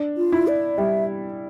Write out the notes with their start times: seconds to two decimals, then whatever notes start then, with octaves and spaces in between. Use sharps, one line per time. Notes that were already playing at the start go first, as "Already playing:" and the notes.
Already playing: D4
0.17 F4
0.32 E4
0.48 D5
0.78 G3 E5